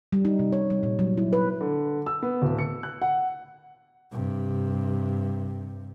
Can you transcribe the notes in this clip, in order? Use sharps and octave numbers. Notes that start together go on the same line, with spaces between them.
G3
D#4
C3
C#5
G3
A#2
F#3
E4
B4
D3
E6
B3
D1
C#7
F#6
F#5
G2 C3